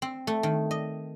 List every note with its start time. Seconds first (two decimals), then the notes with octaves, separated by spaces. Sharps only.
0.02 C4
0.27 A3
0.43 D#3
0.71 D#5